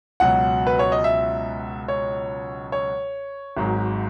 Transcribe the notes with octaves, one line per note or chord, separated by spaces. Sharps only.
C#2 B2 F#3 F#5
B4
C#5
D#5
E5
C#5
C#5
G#1 G#2 F#3